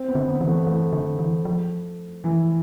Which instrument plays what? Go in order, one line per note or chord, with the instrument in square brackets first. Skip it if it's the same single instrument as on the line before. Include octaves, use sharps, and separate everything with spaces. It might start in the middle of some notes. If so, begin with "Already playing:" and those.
Already playing: [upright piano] C4
B3
[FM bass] D3
[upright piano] B3
[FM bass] E3
[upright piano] A3
[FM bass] E3 [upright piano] A3
[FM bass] D3
E3
F3
[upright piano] E3